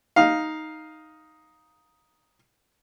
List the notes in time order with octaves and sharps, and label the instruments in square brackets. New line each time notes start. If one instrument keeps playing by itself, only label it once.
[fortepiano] D#4 F5